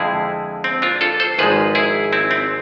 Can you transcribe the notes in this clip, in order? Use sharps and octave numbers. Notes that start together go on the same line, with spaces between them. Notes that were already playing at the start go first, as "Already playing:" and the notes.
Already playing: F2 D3 F3 G#3 E4 G#4
C4
D4 F4
F4 A4
A4 C5
G#1 G#2 F3 G#3 G#4 B4
E4 G#4
C4 E4
C4